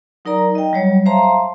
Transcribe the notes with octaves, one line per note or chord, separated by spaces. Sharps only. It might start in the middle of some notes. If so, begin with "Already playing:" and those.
F#3 D#4 A#4 D5 A#5
D#5 G5
F#3 G3 C#5
C5 E5 F5 A5 A#5 C6